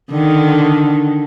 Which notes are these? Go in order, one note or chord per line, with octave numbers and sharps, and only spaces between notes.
D3 D#3